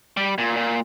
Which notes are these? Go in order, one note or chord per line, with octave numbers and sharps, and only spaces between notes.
G3
A#2
A#2